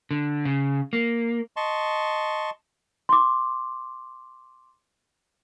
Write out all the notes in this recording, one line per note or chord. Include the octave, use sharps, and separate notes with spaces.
D3
C#3
A#3
D#5 A5 C6 C#6
C6 D6